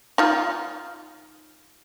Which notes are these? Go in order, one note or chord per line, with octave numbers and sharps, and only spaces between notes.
D#4 F4 F5